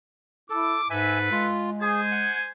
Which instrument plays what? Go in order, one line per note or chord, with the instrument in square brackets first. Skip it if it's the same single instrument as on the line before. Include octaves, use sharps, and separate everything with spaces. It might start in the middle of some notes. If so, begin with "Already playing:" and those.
[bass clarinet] E4 [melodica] A4 [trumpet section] D6
[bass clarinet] G#2 [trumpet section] A4 B4 [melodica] E5 G#5
[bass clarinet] G#3 [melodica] F4
[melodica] G#4 [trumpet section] C5 G#5
[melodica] F#5